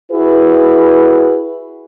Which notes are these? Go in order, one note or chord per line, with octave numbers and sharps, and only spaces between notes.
E4 F#4 G#4 B4